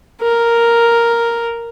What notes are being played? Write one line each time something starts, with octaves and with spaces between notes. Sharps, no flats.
A#4